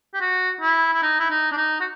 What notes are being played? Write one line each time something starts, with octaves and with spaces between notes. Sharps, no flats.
G4
F#4
E4
E4
D#4
E4
D#4
D4
D#4
F#4